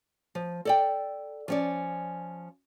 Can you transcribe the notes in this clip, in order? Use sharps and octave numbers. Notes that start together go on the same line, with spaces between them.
F3
A4 D5 G5
F3 C#4 D5